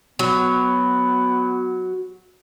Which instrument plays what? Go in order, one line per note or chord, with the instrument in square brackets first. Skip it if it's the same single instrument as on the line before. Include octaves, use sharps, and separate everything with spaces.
[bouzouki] F#3 [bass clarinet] B3